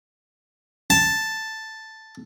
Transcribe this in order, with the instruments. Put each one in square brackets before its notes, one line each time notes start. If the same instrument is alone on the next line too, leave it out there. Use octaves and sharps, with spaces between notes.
[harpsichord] A5